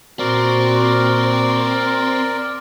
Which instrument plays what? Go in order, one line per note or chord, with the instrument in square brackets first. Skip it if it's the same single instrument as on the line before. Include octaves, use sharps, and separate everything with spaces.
[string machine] A#2 [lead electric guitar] C4 [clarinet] F#4 [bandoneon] A#4 D5